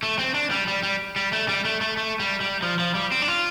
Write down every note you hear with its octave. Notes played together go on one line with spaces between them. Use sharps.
A3
C4
D4
G3
G3
G3
G3
A3
G3
A3
A3
A3
G3
G3
F3
F3
G3
C4
D4
F4